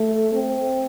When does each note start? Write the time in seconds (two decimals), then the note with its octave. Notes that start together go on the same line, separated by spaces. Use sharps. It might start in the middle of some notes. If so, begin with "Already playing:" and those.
Already playing: A3
0.33 C4